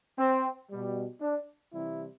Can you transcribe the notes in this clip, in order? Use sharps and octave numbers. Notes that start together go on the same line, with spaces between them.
C4
B2 G3
D4
C3 E3 G3 E4